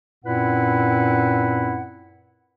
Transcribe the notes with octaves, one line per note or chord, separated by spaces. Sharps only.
F#2 A#2 C4 E4 B4 F#5